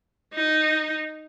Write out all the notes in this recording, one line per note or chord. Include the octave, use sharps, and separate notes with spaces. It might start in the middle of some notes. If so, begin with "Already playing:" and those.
D#4